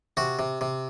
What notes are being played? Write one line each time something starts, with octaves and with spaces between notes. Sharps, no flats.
C3 F#4
C3
C3